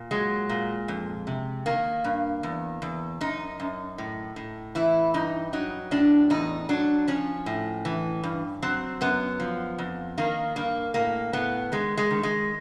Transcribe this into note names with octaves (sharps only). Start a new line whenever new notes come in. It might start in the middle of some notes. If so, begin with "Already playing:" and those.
Already playing: A#2
F#3 G#3
A#2
F2
C3
D#3 A#3
G2
E2
E2
F#2 D#4
F#2
A2
A2
E3 E4
G2 D#4
F#3 D#4
A2 D4
E2 D#4
F#3 D4
F3 C#4
A2
E3
G2
F#3 C4
F#2 B3
F3
F2
D#3 A#3
G2 A#3
A2 A#3
A2 B3
D#3 G#3
G#3
D#3
G#3